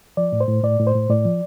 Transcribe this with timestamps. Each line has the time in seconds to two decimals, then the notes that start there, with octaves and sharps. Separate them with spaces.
0.17 F3 D5
0.32 A2
0.41 C5
0.48 A2
0.63 A2 D5
0.80 A2
0.87 C5
0.95 A2
1.09 A2 D5
1.25 F3